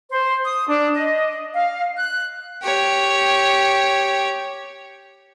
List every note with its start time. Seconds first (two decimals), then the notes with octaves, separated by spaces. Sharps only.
0.11 C5
0.44 D#6
0.69 D4
0.94 D#5
1.54 F5
1.96 F#6
2.63 G4 C#5